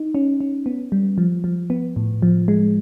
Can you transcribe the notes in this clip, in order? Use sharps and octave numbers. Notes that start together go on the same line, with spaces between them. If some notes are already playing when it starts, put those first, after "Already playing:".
Already playing: D#4
C#4
C#4
B3
G3
F3
F3
B3
A2
F3
G#3